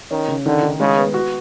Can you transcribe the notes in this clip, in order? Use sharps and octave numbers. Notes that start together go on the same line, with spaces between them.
D#3 C#4
C#3
D3 D#3
D#3
C#3 G#3
B3
F#4